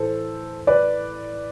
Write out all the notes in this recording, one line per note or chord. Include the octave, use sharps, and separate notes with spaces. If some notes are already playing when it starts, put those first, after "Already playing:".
Already playing: A2 E3 A4 C5
B4 D5